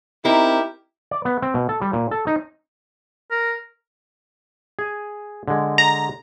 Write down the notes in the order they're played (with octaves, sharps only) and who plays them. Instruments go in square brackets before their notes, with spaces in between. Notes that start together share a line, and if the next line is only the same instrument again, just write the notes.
[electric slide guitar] C4 C5 [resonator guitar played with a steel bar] D#4 A#4 [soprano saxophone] E4 [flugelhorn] G4
[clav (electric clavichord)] D5
B3
C4
B2
A4
G3
A#2
A4
D#4
[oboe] A#4
[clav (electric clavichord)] G#4 G#5
D3 G#3
[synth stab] A#5